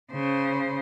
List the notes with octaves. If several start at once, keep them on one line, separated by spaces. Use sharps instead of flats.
C#3 C5